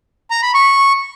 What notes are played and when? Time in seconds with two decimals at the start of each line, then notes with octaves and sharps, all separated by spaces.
0.31 A#5
0.42 B5
0.54 C#6